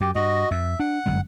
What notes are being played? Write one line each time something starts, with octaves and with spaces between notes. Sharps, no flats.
F#2 G4
G2 F#4 D#5
F2 E5
D4 F#5
G1 F#2 G#3